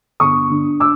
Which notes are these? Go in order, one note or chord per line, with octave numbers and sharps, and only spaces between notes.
G1 C#6 D#6
D3
D6 E6